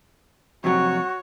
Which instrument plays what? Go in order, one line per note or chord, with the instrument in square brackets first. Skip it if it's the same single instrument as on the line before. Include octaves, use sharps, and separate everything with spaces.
[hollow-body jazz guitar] F2 C3 F#3 [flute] F#4 [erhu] C#5